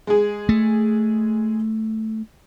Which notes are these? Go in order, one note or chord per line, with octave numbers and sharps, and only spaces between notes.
G#3 G#4
A3